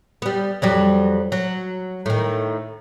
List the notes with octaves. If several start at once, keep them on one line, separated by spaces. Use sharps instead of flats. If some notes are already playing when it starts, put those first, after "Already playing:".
G3 B3
F2 F#3 G3
F#3
A2 D#3